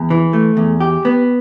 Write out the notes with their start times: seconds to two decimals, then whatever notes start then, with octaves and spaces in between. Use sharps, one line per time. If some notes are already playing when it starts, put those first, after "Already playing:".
Already playing: E2
0.10 E3
0.33 A3
0.57 E2
0.81 G4
1.05 B3